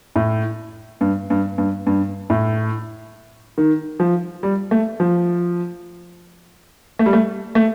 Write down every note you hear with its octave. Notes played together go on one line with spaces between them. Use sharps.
A2
G2
G2
G2
G2
A2
D#3
F3
G3
A3
F3
A3
G3
A3
A3